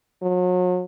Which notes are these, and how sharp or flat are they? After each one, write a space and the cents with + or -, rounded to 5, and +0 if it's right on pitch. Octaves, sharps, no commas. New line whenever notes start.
F#3 -40